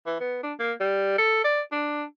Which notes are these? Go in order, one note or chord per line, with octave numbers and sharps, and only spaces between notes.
E3
B3
D4
A#3
G3
A4
D5
D4